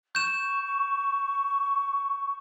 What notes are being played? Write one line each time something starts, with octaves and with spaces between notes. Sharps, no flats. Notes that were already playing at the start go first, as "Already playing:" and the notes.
C#6 G6 E7